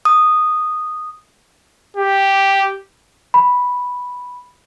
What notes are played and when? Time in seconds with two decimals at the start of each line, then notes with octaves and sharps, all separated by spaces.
0.05 D#6
1.97 G4
3.34 B5